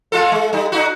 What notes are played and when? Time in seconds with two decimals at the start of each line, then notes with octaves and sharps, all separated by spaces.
0.12 G#3 F4 A4
0.32 G#3
0.53 G3 D#4
0.72 D4 D#4 F#4